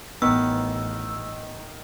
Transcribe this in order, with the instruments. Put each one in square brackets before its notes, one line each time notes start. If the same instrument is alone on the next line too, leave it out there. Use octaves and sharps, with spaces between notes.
[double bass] A1 [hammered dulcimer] D#3 [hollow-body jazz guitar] B3 [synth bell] E6